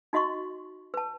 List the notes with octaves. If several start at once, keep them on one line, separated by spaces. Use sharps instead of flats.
D#4 F#4 D#5 C6 C#6
B4 A5